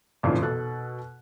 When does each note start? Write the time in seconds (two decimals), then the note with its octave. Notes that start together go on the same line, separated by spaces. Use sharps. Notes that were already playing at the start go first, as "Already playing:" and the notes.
0.23 G#1 F2 A#2 C#3 E3
0.42 B2 A4 F#6